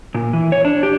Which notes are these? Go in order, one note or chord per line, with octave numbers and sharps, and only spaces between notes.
A#2
E3
C#5
D4
G4